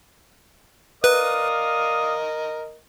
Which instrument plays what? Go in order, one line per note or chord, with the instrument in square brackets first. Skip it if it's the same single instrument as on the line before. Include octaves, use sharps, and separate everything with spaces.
[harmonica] A#4 D#5 [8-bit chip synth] B4 [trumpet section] D5 F5 D#6